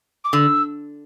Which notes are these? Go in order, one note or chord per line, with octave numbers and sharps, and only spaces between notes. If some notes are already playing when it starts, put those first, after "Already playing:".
D6
D3 E6